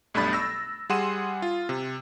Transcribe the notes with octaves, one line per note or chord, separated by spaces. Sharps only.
B1 G2 A3 D4 B5 A6
E6 A#6
G3 G#4 F#5 C6 D#7 E7
F4
C3